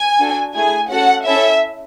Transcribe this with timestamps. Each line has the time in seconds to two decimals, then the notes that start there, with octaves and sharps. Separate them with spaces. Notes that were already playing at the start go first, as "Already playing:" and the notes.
Already playing: G#5
0.20 D4 F#4 A4
0.55 A3 E4 G#4 G#5
0.90 C#4 F#4 A4 F#5
1.27 C#4 E4 A4 E5